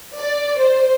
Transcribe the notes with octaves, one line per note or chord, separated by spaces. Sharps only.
D5
C5